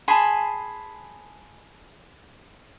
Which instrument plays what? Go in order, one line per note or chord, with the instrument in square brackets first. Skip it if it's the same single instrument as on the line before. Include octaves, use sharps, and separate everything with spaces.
[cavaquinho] G#4 G#5 C6 [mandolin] A5 B5